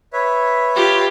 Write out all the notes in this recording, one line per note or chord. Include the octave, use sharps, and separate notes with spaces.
B4 C#5 E5
F4 G4